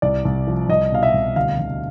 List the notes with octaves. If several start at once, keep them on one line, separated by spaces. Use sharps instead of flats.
C2 D5
C2
F3
C2 D#5
B2 F5
E5
C2
D2 F5
D2